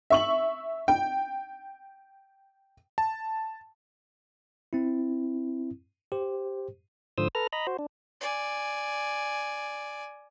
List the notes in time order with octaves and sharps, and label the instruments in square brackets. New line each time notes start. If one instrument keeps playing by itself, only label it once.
[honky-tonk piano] E5 C#6 F#7
G5
[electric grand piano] A5
[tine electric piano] C4 E4
G4 C5
[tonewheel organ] G#2 D3 F3 C5 D#6 E6
A4 B4 A#5 F6
D#5 A#5 B5
F#4 C5
D4
[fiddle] D5 G#5